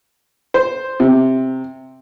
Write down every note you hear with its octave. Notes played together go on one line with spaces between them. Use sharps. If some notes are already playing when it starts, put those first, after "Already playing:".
C5
C3